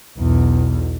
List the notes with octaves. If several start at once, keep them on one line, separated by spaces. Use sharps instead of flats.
B1 E2